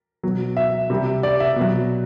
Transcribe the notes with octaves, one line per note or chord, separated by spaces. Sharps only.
B2 F#3
E5
C3 G3
D5
E5
B2 F#3